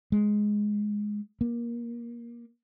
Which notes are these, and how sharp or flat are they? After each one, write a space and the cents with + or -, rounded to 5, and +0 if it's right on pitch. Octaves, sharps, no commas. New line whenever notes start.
G#3 +5
A#3 +20